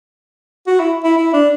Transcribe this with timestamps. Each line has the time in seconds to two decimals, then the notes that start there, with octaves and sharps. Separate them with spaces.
0.67 F#4
0.80 E4
1.04 E4
1.17 E4
1.33 D4